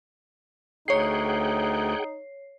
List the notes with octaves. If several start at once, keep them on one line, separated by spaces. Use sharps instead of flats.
D2 D#4 G#4 C#5 F#5 G5 C7